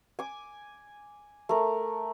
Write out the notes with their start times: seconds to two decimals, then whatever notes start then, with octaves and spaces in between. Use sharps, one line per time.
0.19 G#5 D6
1.49 A3 A#4